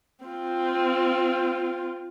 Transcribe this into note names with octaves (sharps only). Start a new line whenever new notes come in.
C4 F4